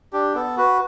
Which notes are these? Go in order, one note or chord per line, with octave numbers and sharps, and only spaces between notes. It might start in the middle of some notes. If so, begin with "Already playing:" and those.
D4 G4
B3 A4
F#4 B4